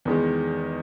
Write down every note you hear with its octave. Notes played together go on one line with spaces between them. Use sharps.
E2 D#3 G#3